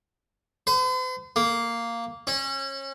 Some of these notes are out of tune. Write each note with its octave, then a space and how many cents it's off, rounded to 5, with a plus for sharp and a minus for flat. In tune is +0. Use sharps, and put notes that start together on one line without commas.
C5 -45
A#3 -5
C#4 -30